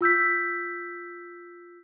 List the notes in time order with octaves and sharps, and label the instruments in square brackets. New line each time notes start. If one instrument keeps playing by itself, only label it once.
[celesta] F4 E6 G6 B6